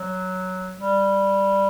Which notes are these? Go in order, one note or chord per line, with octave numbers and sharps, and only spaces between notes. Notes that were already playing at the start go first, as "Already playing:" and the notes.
Already playing: F#3
G3